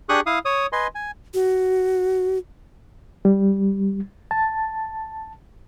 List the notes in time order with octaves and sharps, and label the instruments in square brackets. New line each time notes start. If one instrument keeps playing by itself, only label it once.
[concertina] D4 G4 G#4 C#6 D#6 F#6
E4 F5 D#6
C#5 D#6
B4 D#5 G#5 C6
G#5
[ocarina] F#4
[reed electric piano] G3
A5